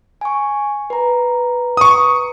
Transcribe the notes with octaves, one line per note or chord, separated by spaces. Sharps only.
G#5 C#6
B4 A#5
C#6 D#6